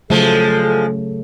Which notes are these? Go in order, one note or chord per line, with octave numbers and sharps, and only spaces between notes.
C#3 F3 F#3 G#3 A3 A4